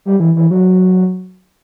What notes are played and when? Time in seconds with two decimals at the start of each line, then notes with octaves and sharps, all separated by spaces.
0.06 G3
0.20 E3
0.36 E3
0.51 F#3